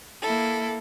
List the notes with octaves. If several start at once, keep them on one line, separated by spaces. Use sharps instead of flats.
A#3 E4 A4